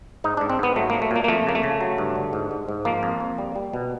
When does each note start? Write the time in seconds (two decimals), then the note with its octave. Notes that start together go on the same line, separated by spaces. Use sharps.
0.24 G#2 D#4
0.37 G#2 D4
0.50 C4
0.59 G#2 B3
0.76 F#3 A3
0.90 F#3 A#3
1.02 A3
1.11 A#2 A#3
1.24 A#3
1.28 F2 A3
1.46 C#3 A#3
1.55 A3
1.63 C#3
1.81 F#3
1.98 G2
2.16 D3
2.33 G#2
2.51 G#2
2.69 G#2
2.85 F3 A#3
3.03 F2
3.20 F2
3.38 G3
3.56 G3
3.74 B2